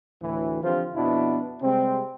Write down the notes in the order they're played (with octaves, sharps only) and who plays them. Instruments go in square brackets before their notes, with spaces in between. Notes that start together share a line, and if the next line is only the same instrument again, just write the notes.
[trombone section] D2 A2 E3
D3 F3 C4 F4 G4 C5
F2 B2 B3 D4 E4
C3 G3 G#3 C4